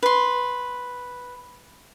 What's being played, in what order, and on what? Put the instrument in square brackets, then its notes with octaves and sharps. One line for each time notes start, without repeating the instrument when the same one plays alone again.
[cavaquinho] B4 C6